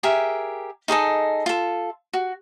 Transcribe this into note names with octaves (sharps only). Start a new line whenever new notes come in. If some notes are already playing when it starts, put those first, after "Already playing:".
G4 G#4 A#4 E5
D#4 G#4 A4 D#5
F4 A4
F#4